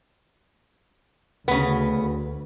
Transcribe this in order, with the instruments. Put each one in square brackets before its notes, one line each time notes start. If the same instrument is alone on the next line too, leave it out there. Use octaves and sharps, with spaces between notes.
[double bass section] D2 [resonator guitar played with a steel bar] C#3 B3